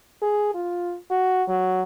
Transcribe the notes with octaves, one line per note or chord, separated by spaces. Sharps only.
G#4
F4
F#4
F#3